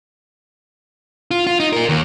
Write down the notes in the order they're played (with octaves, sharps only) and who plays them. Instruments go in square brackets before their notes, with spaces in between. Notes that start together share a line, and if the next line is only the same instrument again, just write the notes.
[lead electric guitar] F4
F4
D#4
F4 A#4
D#2